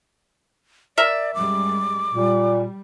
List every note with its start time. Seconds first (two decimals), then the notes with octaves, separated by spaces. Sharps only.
0.98 A#4 D5 E5
1.34 F#2 G3 G#3 D6
2.13 A#2 G3